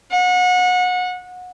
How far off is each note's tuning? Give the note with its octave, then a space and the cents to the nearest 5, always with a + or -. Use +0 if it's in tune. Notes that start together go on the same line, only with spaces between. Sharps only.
F#5 -30